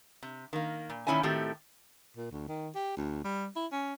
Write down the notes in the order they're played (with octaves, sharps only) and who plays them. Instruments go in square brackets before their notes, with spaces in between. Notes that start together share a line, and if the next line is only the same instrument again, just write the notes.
[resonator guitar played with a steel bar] C3
D#3 A#3
A#2
A#2 D#3 C#4 E4 E5 G#5
A2 D#3 A3 C4 F#4 G4
[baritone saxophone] A#2
D2
D#3
G4
D2
G3
E4
C#4